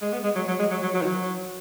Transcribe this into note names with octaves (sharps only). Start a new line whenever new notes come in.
G#3
B3
G#3
F#3
F#3
G#3
F#3
F#3
F#3
D#3
F#3